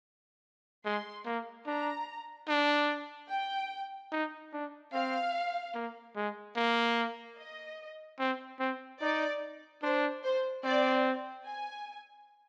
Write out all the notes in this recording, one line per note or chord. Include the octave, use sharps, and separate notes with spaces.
G#3 C6
A#3
D4 A#5
D4
G5
D#4
D4
C4 F5
A#3
G#3
A#3
D#5
C4
C4
D#4 D5
D4 C5
C5
C4 D5
G#5